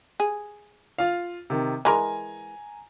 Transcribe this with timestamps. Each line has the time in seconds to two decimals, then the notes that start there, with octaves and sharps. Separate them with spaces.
0.20 G#4
0.98 F4 F5
1.50 C3 D#3
1.85 E3 G#3 A#4 G#5 A#5